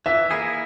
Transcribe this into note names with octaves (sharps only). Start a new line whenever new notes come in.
E3 E5
A#3 E4 G#4